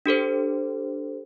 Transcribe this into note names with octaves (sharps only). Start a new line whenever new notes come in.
D4 G4 A4 C5